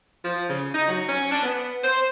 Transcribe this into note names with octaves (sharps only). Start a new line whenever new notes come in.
F3
C#3
D#4
F#3
C#4
D4
B3
C5